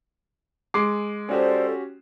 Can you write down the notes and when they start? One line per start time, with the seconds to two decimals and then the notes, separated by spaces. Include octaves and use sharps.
0.74 G#3 D6 C7
1.29 C#4 F#4 G4 A4 C5 D5